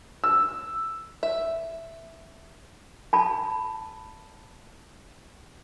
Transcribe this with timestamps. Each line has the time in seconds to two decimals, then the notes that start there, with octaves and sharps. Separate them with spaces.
0.24 E6
1.23 E5
3.13 A5 B5